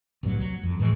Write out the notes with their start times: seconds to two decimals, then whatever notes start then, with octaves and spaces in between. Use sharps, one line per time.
0.23 D1 C2 G2 F#3
0.38 F#3
0.63 F2
0.79 A2 E3 G3 G#3